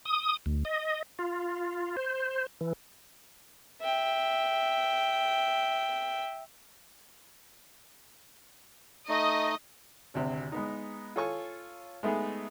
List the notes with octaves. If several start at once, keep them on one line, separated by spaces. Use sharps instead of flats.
D#6
D2
D#5
F4
C5
E3
E5 G5
A3 D#4 D#5
G#1 D2 C3
G#3 B3 D#4
F4 A4 C#5 G#5 C#6
G#3 A3 B3 D#4 G#4